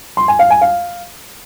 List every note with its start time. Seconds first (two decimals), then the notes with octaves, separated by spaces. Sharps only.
0.17 C6
0.28 G#5
0.39 F5
0.50 G#5
0.61 F5